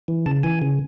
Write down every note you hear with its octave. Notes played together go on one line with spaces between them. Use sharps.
E3
C#3 A5
E3 G#5
C#3